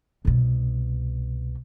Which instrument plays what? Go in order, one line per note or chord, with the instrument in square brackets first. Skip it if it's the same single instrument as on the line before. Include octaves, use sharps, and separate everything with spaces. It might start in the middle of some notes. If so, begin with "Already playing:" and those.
[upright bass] C2 B2